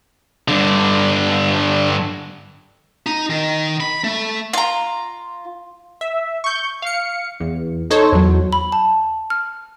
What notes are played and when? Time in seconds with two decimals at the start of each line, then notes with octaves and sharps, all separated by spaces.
0.48 G2 D3
3.06 D#4
3.30 D#3
3.80 B5
4.04 A3
4.53 F4 A#5
6.01 E5
6.44 C#6 G6
6.82 F5 C#7
7.40 E2
7.90 D#4 A4 C5 C#5
8.12 E2 F#3
8.53 B5
8.72 A5
9.30 F6